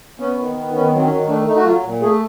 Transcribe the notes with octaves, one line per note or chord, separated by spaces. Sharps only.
B3 C#4
D#3
B3
D#3 C#4
F#3 C4
C#4
D#3
A3 D4
A3 D#4
F#4
F#3 F4
A#2
A3 G#4